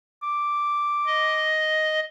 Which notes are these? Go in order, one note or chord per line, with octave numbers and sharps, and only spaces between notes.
D6
D#5